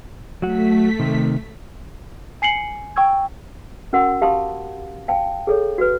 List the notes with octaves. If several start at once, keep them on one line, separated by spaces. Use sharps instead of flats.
F#3 A3 F#4 B6
C3 D#3
G#5 C7 C#7 F#7
G5 C#6 E6 G#6
C#4 F#4 A#4 F#5 C6
G4 F5 A5 B5 C6 D#6
F5 G5 A5
G#4 A4 C#5
F#4 B4